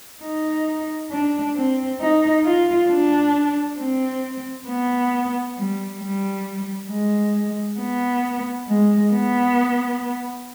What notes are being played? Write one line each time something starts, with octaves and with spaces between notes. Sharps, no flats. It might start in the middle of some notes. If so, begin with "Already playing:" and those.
D#4
D4
C4
D#4
F4
D4
C4
B3
G3
G3
G#3
B3
G#3
B3